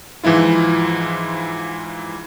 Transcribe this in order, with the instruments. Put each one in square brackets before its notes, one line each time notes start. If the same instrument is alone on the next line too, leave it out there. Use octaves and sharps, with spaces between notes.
[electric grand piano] G#2 E3 F3 E4 F4